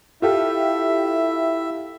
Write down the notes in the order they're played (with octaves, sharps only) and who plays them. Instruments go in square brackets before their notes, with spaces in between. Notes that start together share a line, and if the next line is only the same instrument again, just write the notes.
[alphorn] E4 [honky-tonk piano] F4 G4 A4 [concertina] E5